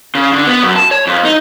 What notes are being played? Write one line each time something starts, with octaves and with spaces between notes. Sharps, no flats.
C#3
D3
B3
F#2
A5
C#5
F2
D#4